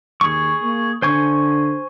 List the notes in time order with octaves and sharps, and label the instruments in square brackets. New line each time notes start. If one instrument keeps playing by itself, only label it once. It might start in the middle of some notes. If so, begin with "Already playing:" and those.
[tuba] D#2 [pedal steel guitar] G#4 C#6
[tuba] A#3
[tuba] D3 [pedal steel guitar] C5 G#5 C#6